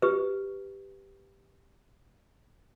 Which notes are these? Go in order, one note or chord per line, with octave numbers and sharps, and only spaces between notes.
G4 B4